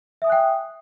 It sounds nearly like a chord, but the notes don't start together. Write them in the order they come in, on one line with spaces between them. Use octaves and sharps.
E5 D#6 G#5 F#6 G5